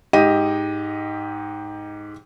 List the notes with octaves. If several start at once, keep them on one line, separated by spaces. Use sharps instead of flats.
G#2 G4 D#5 D#7